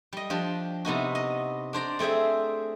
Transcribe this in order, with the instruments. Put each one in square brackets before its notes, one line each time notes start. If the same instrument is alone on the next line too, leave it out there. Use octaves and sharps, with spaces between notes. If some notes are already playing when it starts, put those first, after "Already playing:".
[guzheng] G3 D#5
F3 D4 G4
C3 B3 D#4 F#4
D#5
D4 C5 D5 A#5
A3 C4 G#4 C5 E5